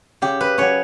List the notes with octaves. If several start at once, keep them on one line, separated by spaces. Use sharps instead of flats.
C#3 G4
B4
F#3 C#4 C#5